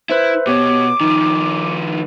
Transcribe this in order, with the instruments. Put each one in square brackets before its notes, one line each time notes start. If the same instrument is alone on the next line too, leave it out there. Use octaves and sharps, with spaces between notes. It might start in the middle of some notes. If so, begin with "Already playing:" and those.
[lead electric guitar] E4 [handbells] B4 C5 E5
[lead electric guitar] B2 [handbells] G4 C#5 [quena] D6
[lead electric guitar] D#3 F3 [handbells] D#4